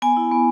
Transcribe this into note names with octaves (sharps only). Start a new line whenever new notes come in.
B3 G#5
E4
B3